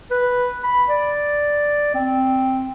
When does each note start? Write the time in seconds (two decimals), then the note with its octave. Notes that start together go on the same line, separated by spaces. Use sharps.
0.11 B4
0.64 B5
0.88 D5
1.94 C4